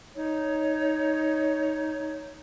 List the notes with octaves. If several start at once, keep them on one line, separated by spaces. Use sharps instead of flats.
D#4 C#5